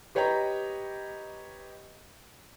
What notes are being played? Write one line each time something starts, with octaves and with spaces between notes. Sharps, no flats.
G4 B4 C#5 D#5 G5 A#5